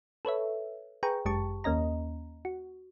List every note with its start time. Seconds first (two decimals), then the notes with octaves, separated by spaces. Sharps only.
0.25 A4 B4 C#5 E5
1.03 G#4 B4 G5 A#5 C#6
1.25 G1 F#2 G#3 G4 A5 C#6
1.64 D#2 A#3 C#4 D#5 A#5
2.45 F#4